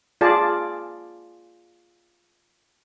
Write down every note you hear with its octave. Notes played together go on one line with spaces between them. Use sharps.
F4 G#4 D5 A5